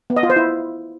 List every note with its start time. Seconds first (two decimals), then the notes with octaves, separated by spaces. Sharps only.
0.10 B3
0.17 D#5
0.23 F4
0.30 C5
0.36 E4